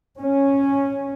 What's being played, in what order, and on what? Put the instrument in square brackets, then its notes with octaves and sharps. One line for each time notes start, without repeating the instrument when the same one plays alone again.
[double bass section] C#4